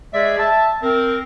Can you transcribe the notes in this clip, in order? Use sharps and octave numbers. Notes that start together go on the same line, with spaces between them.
G#3 G#4 D5 E5
E5 A5
C4 A#4